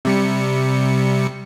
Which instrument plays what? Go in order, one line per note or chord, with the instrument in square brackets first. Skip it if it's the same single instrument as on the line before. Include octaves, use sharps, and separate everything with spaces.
[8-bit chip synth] C3 G3 C#7